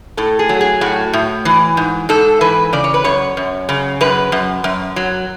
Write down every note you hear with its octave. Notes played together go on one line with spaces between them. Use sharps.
A2 A4
G#4
F#3
G#4
A2 F#4
A2
E3
G#2
G#2 A4
E3 B4
C#3 D5
C#5
B4
F#2 C#5
F#2
C#3
F#2 B4
F#2
F#2
F#3